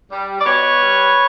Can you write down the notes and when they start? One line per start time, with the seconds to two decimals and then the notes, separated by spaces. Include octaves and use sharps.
0.11 G3
0.40 D5
0.45 B2 B4 C#5
0.81 G3